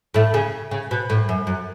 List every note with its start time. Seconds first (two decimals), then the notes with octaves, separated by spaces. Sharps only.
0.14 A2 A3
0.34 C#3
0.71 C#3
0.91 B2
1.10 A2
1.29 F#2
1.47 F#2